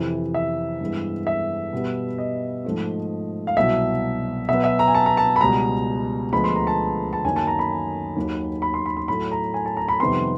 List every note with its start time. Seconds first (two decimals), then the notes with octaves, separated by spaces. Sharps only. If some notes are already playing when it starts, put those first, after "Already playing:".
Already playing: F2 C3 E3
0.34 E5
0.81 G2 E3 G#3 B3
1.27 E5
1.73 B2 G3 B3
2.18 D#5
2.65 G#2 F3 A3
3.47 F5
3.57 C2 B2 F#3 E5
4.49 B2 F#3 B3 E5
4.64 E5
4.79 A#5
4.88 G#5
4.95 A5
5.06 A#5
5.17 A5
5.36 B5
5.41 C#2 B2 G3 A#5
6.33 D2 D3 F3 G#3 B3 B5
6.44 C6
6.56 A#5
6.67 A5
7.13 A5
7.24 F#2 D#3 F#3 A#3 G#5
7.36 A5
7.47 A#5
7.59 B5
8.16 D#2 D#3 F#3
8.62 B5
8.74 C6
8.86 B5
8.97 C6
9.08 A2 F#3 A3 B5
9.32 A#5
9.54 G#5
9.66 A5
9.77 A#5
9.88 B5
10.00 F2 C3 D#3 G3 B3 C6